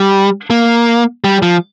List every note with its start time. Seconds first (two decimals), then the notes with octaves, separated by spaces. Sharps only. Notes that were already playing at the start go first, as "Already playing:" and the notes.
Already playing: G3
0.50 A#3
1.24 G3
1.42 F3